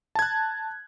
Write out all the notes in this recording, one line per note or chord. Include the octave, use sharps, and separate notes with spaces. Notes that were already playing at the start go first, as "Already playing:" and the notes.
A5 F#6 G#6